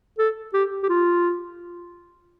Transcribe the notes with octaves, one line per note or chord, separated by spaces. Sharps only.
A4
G4
G4
F4